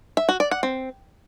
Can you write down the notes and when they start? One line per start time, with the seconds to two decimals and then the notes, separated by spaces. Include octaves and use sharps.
0.17 E5
0.29 F#4
0.40 D5
0.51 F#5
0.63 C4